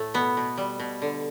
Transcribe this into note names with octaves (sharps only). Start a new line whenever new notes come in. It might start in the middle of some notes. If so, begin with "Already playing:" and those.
Already playing: A2 A3
B2 B3
B2
G3
B2
D3